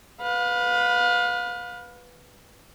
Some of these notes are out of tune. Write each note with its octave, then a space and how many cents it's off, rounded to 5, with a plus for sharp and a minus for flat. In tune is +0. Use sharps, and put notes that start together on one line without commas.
B4 +0 F5 +30